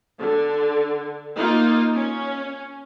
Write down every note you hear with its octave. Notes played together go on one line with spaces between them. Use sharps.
D3
A#3 D#4 F4
C#4